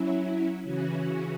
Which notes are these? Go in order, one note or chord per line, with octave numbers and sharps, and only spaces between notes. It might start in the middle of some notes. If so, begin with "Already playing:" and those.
Already playing: F#3 C#4 E4
C#3 E3 C#4 F#4